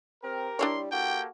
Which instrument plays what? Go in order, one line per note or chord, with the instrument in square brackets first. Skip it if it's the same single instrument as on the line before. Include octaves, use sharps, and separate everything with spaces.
[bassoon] C4 [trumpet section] G4 A#4
[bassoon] G3 [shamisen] D4 E4 C#5 [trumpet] C6
[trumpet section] A#3 G4 A4 [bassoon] F#4 [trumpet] G5